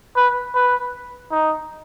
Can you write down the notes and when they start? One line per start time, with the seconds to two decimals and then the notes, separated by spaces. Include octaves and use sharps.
0.17 B4
0.55 B4
1.32 D#4